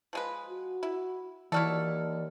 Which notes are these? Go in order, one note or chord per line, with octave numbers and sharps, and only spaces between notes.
F3 G#3 B4
F#4
E4
D#2 E3 E4 F#4 A4 D5 F6